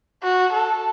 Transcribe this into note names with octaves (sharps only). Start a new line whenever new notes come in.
F#4
A4